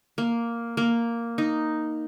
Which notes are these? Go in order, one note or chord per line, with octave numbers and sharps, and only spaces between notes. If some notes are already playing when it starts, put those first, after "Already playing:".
A#3
A#3
D#4